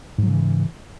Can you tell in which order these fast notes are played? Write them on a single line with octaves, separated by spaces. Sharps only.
G#2 F#3 C#3 E3